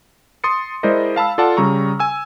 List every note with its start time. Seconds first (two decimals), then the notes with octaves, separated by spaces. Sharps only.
0.44 C6 D#6 A6 C#7
0.83 G#3 E4 A#4 C5 D5 D#5
1.16 F5 A5 B5 E6
1.38 F4 A4 D5 F#5 A5
1.57 C#3 G3 A#5 C#6
2.00 G#5 E6